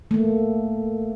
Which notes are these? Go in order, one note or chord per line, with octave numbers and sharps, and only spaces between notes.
A3 A#3